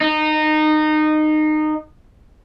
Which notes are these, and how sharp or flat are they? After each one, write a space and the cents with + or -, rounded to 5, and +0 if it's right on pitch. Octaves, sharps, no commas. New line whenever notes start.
D#4 -20